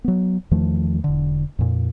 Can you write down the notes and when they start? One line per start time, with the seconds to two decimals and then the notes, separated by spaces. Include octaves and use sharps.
0.04 F#3 B3
0.51 E2 D#3 F3 A3
1.04 E1 D3
1.59 F2 A#2